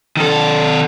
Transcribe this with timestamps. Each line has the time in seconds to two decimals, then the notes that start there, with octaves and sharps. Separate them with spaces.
0.17 D#3 A4